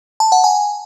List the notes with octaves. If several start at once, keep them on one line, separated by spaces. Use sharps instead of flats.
A5
F#5
G#5